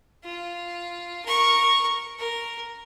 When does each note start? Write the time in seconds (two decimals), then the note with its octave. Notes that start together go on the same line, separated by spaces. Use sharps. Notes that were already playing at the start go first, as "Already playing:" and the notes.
0.24 F4
1.25 A#4 C#6
2.19 A#4